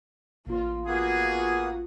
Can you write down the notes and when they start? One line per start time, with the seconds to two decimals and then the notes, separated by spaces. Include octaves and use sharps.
0.46 A1 A#3 F4
0.87 A#3 B3 F#4 G#4 D#6